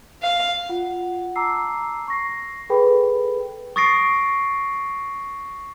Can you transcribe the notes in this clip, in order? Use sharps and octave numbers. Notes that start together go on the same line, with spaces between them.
F5
F4 F#5
A5 A#5 D6 E6 C7
C#6 A#6 C7
G#4 A4 B4 G5 B5
C#6 D#6 A6 A#6 C7 D7